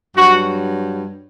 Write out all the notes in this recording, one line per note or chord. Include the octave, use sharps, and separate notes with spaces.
G2 F#3 F#4